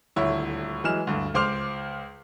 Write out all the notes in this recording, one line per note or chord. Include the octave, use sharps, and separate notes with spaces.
D#1 D2 E4 C#5
E3 F#3 G#3 F6 E7
D2 G2
C#2 C5 D6 F6 F7